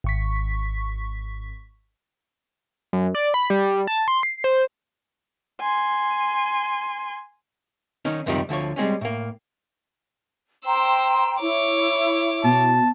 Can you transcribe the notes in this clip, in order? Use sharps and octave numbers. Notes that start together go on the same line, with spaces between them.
G#1 C#6 B6
F#2
D5
B5
G3
A5
C6
C7
C5
G#5 C6
D#3 C#4 D#4
C#2 F#2 C3 D#3 F3 G3
D2 D3 F3 C#5
G3 G#3 C4 C#4
A2 A#3
C5 G5 A#5 C6 E6
E4 C#5 D6
B2 A5